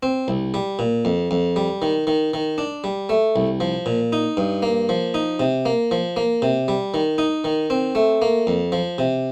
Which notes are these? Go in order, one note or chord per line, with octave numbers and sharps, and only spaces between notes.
C4
C2
G3
A#2
F2
F2
G3
D#3
D#3
D#3
D4
G3
A3
C2
F3
A#2
D#4
G2
A#3
F3
D#4
C3
A#3
F3
A#3
C3
G3
D#3
D#4
D#3
C4
A3
A#3
F2
F3
C3